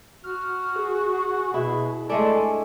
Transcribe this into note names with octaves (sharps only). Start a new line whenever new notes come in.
F#4 F6
G#4
B2 E4
G#3 A3 D4 A4 G#5